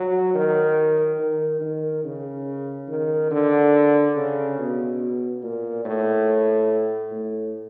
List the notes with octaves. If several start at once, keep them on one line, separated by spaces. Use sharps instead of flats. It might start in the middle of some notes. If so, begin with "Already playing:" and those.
Already playing: F#3
D#3
D#3
D#3
C#3
D#3
D3
C#3
B2
A#2
A2
A2